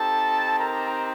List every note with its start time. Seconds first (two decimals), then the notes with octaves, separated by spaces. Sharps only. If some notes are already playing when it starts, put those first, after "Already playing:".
Already playing: C4 D#4 G4 A4 A5
0.58 A#4 A#5